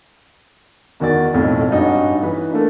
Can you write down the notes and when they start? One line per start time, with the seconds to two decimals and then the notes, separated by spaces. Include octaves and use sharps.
1.00 E2 D#3 F#4 D5 A6
1.34 B1 F2 A2
1.70 G2 C#4 D#4 F#4
2.23 E3 B4
2.51 A3 A#3 D4